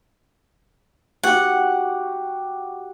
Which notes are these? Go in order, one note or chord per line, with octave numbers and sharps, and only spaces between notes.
F#4 G4 F#5